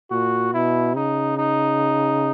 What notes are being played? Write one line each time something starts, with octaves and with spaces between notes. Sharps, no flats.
A#2 F#4
B2 E4
C#3 D#4
D#4